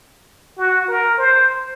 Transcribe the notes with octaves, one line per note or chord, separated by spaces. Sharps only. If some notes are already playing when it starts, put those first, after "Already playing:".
F#4
A#4
C5